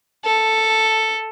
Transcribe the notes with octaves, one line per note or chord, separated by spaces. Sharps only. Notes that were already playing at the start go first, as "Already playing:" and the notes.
A4